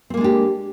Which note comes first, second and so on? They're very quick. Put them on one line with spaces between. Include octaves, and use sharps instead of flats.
C4 A#3 G#3 D4 G4